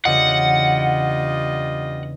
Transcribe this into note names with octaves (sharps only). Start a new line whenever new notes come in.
E2 C#3 G3 D4 F4 D#5 F#5